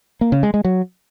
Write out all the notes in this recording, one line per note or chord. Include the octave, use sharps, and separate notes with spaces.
A#3
C#3
G#3
G#3
F#3